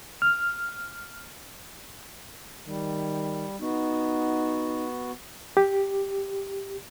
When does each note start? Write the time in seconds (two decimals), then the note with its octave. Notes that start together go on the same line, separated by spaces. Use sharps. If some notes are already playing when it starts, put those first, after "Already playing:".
0.22 F6
2.67 D#3 G3
3.61 B3 D#4 F#4
5.57 G4